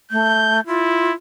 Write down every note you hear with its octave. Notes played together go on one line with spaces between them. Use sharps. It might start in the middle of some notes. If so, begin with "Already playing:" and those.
A3 G6
E4 F4